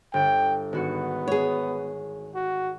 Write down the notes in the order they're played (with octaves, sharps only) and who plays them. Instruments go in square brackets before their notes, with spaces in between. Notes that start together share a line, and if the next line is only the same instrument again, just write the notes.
[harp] G1 [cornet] G5
[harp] G#1 F#4 C#7 [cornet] B3
[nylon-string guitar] G#4 C#5
[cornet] F#4